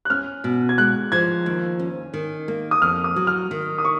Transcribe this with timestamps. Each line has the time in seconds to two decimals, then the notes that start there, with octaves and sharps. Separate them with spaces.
0.05 F#6
0.10 C#4 F6
0.44 B2
0.69 G#6
0.78 G#3 F#6
1.12 F3 G#6
1.46 D#2
1.79 C#4
2.14 D#3
2.48 A#3
2.71 D#6
2.82 F2 F6
3.04 D#6
3.16 F#3
3.27 F6
3.51 D#3
3.78 D#6
3.85 C#6